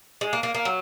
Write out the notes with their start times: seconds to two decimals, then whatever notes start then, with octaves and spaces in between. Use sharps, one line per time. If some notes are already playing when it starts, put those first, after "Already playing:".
0.21 G#3
0.33 A#3
0.43 A#3
0.55 A#3
0.65 F#3